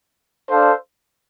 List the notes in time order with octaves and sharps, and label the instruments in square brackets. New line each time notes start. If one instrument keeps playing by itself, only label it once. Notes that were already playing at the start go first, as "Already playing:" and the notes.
[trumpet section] D4 A4 C5 F5